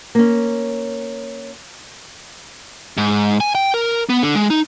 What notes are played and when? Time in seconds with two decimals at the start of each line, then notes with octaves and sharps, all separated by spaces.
0.15 A#3 C#4
2.98 G#2
3.40 G#5
3.55 G5
3.74 A#4
4.09 B3
4.23 D3
4.35 G#3
4.50 D#4